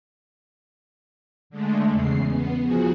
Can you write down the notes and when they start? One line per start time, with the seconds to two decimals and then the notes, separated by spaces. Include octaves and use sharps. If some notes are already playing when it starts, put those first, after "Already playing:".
1.50 D3 G#3 A3
1.91 E2 C#3 C7
2.30 B3
2.63 F3 F#4 G#4